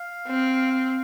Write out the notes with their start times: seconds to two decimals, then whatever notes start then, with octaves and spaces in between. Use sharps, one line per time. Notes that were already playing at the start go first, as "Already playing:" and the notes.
Already playing: F5
0.27 C4
0.71 F5